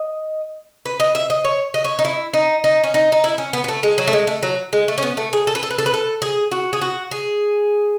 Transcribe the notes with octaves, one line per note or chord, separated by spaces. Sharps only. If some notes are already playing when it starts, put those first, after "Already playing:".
Already playing: D#5
B4
D#5
E5
D#5
C#5
D#5
C#5
D#4
E4
D#4
D#4
C#4
D#4
D#4
E4
C#4
B3
B3
A3
G#3
F#3
A3
G#3
A3
F#3
G#3
A3
C#4
B3
A3
G#4
A4
B4
A4
B4
A4
B4
A4
G#4
F#4
G#4
F#4
G#4